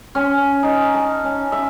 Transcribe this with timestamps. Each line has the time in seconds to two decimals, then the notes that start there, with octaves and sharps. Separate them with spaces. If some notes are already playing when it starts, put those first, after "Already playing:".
0.15 C#4
0.63 D#4
0.94 A5
1.24 C#4
1.52 E5